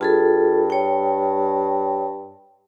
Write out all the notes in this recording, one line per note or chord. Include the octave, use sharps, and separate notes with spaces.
G2 F4 G#4 A4
C#5 G5